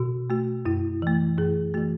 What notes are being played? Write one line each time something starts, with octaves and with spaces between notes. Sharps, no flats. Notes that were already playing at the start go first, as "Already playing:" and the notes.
Already playing: B2 F#4
A3 F#4
F#2 E4
E3 A3
F#2 G#4
E3 A3 F#4